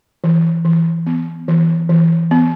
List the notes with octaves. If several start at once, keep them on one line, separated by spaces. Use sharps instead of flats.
E3
E3
B3
E3
E3
B3